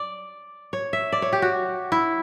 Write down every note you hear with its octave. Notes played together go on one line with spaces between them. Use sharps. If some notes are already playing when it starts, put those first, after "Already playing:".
Already playing: D5
C#5
E5
D5
C#5
G4
F#4
E4